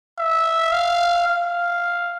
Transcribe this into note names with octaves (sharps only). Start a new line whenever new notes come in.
E5
F5
F5